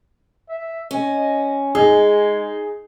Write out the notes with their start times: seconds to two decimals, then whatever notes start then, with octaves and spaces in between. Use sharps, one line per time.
0.49 E5
0.91 C#4 D#5
1.75 G#3 D#4 G#4